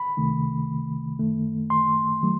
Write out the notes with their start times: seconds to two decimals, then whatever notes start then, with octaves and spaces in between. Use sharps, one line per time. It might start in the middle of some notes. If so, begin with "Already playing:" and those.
Already playing: B5
0.17 C2 C3 D#3 A3
1.19 F#2 D#3 A3
1.70 C6
2.22 D#3 F#3 A3